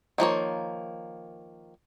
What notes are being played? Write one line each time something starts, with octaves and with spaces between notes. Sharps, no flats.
D#3 F3 A#3 C#5